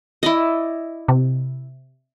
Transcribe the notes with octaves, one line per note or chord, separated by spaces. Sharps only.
E4 D5 D#5
C3